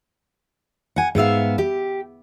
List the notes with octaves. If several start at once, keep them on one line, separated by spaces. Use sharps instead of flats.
F#5 G#5
G#2 B3 E5 F5
G4